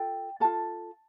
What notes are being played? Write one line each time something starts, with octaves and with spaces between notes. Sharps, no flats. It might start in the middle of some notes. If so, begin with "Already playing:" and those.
Already playing: F4 A4 G5
F4 A4 A5